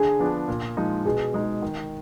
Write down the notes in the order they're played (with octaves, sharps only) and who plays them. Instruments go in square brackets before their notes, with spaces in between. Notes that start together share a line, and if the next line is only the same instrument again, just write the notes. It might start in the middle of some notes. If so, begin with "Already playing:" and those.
Already playing: [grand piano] D3 [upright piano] G#4
[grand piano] F3 B3 D4
A#2
F3 G#3 D#4
[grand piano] B2 [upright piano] G#4
[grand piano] G#3 D#4
D#3